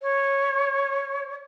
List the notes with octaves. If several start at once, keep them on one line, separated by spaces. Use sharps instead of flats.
C#5